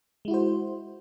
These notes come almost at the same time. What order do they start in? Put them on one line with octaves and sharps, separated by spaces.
G#3 E4 F#4 C5